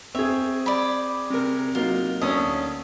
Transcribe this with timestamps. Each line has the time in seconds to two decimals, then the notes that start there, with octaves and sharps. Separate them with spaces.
0.15 C4 G#4 C#5 E5
0.66 D5 B5
1.30 C3 A#4
1.75 F#3 A#3 D#4 F4
2.21 D2 C#4 D#6